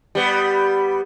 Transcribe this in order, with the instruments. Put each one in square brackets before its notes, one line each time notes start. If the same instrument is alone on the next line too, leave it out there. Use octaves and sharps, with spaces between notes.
[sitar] G3 B3